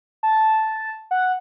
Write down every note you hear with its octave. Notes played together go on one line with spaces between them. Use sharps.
A5
F#5